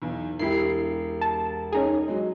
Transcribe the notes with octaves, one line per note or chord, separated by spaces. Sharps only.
B1 E2
E1 E4 G4 C7
A5
C#4 D#4 G#4
F#3 G#3